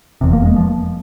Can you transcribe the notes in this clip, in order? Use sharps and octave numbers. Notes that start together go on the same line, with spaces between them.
F1 E2 C3
A#3
G#3
F3